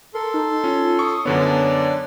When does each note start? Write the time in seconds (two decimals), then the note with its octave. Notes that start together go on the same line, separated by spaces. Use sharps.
0.14 A4 A#4 C6
0.34 D#4
0.64 C#4 F4
0.99 C#6 D#6
1.25 F#2 D3 B3 D4 C#5 D5